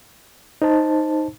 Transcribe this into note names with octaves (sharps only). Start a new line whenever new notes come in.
D#4 C5 A5